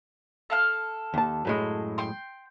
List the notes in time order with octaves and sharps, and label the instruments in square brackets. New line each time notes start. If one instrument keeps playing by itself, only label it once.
[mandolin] A4 F5 F6
[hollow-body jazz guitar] D#2 A5
F#2 A2 G#3
[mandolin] G5 C6